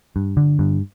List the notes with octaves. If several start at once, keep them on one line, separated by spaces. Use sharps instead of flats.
G2
D3
G2